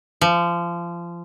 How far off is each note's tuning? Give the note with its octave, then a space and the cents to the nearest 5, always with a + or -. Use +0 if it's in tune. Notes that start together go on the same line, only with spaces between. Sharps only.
F3 -25